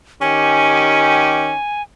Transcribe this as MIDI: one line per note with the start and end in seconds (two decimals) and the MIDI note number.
0.21 1.51 51
0.21 1.51 61
0.21 1.51 67
0.21 1.82 80